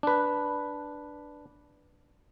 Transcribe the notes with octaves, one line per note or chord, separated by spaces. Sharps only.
D4 B4